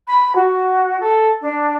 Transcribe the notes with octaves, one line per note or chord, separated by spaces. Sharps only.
B5
F#4
A4
D4